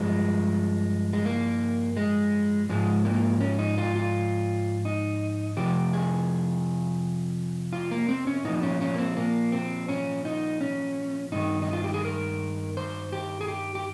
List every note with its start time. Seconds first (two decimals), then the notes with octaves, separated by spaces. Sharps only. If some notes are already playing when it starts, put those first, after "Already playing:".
Already playing: G2 F3 G#3
1.13 G#3
1.25 A#3
1.97 G#3
2.69 G#2 F3 G#3
3.05 A#3
3.41 C#4
3.59 D#4
3.78 F4
3.95 F4
4.85 D#4
5.57 F2 C3 F3 G4
5.93 G#4
7.73 F4
7.91 A#3
8.09 C4
8.27 C#4
8.44 A#2 F3 D#4
8.63 C#4
8.81 C#4
8.94 A#3
8.98 C4
9.17 A#3
9.52 C4
9.89 C#4
10.25 D#4
10.61 C#4
11.32 G2 D#3 D#4
11.62 D#4
11.73 F4
11.84 G4
11.94 G#4
12.05 A#4
12.77 C5
13.12 G4
13.41 G#4
13.48 G4
13.75 G4